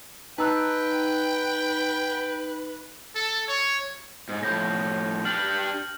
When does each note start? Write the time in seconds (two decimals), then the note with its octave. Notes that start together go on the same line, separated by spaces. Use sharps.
0.38 D#4 B4 G5 A5 A#5 E6 F#6
3.15 A4
3.48 C#5
4.29 G#2
4.43 A2 F3 G6 A#6
5.25 D4 G4 F6 F#7